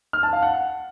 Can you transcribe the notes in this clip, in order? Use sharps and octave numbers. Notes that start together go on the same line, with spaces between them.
F6
A5
F5
F#5